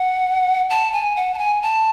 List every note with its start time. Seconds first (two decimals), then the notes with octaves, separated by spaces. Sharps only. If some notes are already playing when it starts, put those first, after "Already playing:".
Already playing: F#5
0.70 A5
0.93 G#5
1.16 F#5
1.34 A5
1.38 G#5
1.62 A5